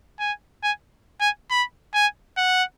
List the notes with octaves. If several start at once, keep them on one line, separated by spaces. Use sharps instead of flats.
G#5
G#5
G#5
B5
G#5
F#5